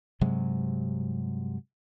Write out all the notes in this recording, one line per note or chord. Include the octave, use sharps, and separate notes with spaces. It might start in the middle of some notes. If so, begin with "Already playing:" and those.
G2 C3 F#3 G#3